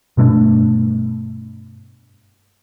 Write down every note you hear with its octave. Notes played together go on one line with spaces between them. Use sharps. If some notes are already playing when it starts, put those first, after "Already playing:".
G2 B2 A3 D4